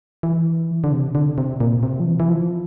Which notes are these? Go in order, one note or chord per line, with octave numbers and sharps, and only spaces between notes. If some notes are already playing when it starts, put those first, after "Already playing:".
E3
D3
C3
D3
C3
A#2
C3
F3
E3
E3
F3